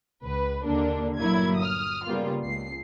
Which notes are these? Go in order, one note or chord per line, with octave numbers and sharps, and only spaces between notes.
C#2 B4
D#2 D3 A#3 D4
G1 A#2 F#3 A#3 E4 G#6
D#6 F6
C#3 G3 A#3 B3 F4
C#2 C7